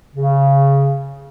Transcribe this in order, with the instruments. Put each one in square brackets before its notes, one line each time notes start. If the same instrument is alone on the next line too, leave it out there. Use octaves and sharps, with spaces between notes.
[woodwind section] C#3